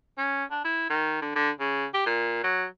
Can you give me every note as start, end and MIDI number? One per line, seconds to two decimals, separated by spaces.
0.18 0.44 61
0.51 0.62 62
0.65 0.90 64
0.90 1.20 51
1.22 1.34 50
1.36 1.51 50
1.60 1.86 49
1.94 2.02 67
2.06 2.39 46
2.44 2.65 54